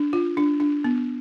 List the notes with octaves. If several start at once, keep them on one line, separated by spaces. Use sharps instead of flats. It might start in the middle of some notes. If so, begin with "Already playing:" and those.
Already playing: D4
F4
D4
D4
B3